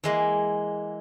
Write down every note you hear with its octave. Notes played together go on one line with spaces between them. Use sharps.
E3 G#3 A#3